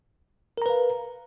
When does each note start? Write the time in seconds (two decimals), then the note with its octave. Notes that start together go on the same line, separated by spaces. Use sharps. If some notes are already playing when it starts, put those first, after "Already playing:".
0.58 A#4
0.62 A#5
0.66 B4
0.70 F5